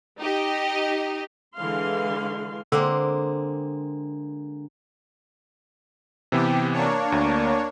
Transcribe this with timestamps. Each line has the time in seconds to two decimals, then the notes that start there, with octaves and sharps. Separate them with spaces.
0.19 D#4 G4 D#5
1.57 D3 E3 G#3 F5 C6
2.72 D3 G#3 A#3 C4
6.32 C3 E3 B3 G4
6.72 A#3 D4 C#5
7.12 D2